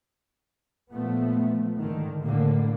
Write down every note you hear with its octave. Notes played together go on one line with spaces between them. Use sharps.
A#2 F3 A3 B3
G#2 D3 D#3
A2 D3 A#3